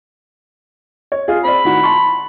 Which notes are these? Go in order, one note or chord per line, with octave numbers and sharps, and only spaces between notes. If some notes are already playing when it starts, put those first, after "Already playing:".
C#5
F4 G#4
C4 D5 B5
A2 D#3 F#4
A5 C6 C#6